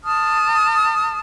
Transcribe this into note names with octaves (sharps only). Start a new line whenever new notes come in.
A5 D#6 F6